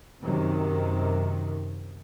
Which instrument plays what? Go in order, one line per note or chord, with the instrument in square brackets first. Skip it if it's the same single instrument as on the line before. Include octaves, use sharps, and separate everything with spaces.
[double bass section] F#2 C3 D#3